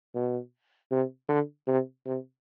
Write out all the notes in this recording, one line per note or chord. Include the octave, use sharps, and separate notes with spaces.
B2
C3
D3
C3
C3